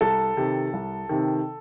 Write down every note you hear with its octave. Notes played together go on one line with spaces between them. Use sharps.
C2 A4
C3 D#3
C2
C3 D#3